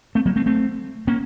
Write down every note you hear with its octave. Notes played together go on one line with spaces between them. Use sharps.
A3 C4
F#3 A#3
A3 C4
A3 C4
A#3 C#4